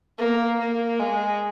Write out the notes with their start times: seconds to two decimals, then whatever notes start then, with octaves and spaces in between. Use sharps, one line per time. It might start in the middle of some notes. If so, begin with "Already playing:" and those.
0.18 A#3
0.60 A#3
1.00 G#3